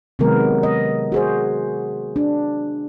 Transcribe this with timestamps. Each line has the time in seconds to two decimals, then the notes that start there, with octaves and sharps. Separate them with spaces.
0.19 C3 D#3 F#3 G#3 B3 A#4
0.63 D#5
1.12 F#4 G#4 C5
2.16 D4